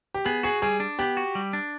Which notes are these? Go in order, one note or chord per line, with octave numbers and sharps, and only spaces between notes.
G4
B3 G#4
F#4 G#4
G3 G#4
D4
B3 G4
F#4
G3
D4